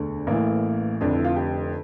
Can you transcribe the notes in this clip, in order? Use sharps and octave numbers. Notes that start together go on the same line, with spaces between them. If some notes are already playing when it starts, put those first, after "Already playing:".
Already playing: E1 D2 D3
A1 A2 E3 A#3
F1 F2 D3 D4
E4
F4
G4